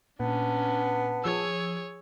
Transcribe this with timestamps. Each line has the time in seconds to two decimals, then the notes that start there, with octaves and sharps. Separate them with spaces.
0.20 A#2 B3 C#4 D4 A5
1.24 F3 G#4 C#5 E6